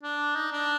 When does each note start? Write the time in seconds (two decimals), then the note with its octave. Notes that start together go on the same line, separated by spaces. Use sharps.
0.03 D4
0.36 D#4
0.53 D4